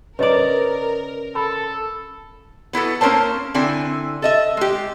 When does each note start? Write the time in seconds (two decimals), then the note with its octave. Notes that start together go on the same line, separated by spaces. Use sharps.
0.19 C#3 A#4 B4 D5 D#5 A#5
1.35 A4 A#5 B5
2.73 B3 E4 F#4 A4
3.01 A#3 C#4 D#4 A#4 C5 A5
3.54 D3 C4 E4 G#5
4.22 A4 D#5 E5
4.57 G#3 G4